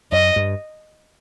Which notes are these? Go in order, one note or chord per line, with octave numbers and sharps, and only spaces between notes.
F#2 D#5
G2